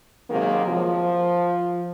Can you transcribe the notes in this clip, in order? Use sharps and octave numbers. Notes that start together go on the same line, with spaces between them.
C3 D#3 F#3 G#3 A#3
F3